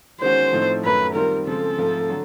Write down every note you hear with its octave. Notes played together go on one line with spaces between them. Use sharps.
D#3 G#3 C#4 F#4 C5
A2 F3 A3 C4 D#4
F#2 D#3 F#3 A3 B4
D#3 G3 C4 F4 A#4
C#3 F3 G#3 C4 A4
G#2 F3 A3 C4
D3 F#3